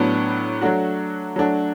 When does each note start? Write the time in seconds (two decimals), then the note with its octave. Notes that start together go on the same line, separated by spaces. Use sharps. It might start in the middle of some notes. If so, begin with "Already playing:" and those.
Already playing: A2 F#3 B3 D4
0.61 F#3 A3 D4 F#4
1.36 F#3 A3 D4 F#4